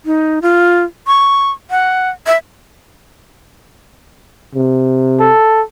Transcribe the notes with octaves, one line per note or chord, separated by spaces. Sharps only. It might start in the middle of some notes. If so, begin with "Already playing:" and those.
D#4
F4
C#6
F#5
E5
C3
A4